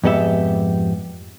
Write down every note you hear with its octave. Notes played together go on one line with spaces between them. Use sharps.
F2 G#2 B3 G4 E5